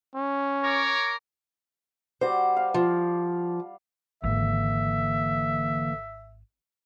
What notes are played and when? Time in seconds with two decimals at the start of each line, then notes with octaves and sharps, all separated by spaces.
0.15 C#4
0.63 A#4 C#5 D6
2.21 G3 F#4 C5 D5
2.57 F5
2.74 F3
4.24 G#1 D3 E3 A#3 E5